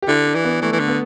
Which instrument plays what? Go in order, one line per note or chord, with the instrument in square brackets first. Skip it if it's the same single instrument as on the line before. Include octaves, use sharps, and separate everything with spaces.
[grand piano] G4
[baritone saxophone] D3 [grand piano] E4
[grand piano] D4
[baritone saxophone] E3
[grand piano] B3
[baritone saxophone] E3 [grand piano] A3
[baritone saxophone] E3
D3
[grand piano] B3